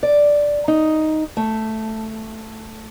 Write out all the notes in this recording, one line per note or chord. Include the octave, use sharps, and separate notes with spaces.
D5
D#4
A3